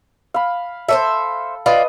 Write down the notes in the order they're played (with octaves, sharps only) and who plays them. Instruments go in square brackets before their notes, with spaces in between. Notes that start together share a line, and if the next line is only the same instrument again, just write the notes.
[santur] F5 B5
[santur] A4 [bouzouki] C5 D5 E5
[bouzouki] F4 D5 [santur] B4 D#5